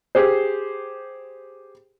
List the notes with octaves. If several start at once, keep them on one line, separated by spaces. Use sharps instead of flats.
G4 G#4 C5